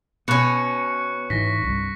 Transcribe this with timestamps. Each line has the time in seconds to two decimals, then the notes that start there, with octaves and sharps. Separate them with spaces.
0.28 B2 B3 C#4 C#6 F#6 C#7
1.30 G#2 E3 A#6 B6
1.62 C2 G2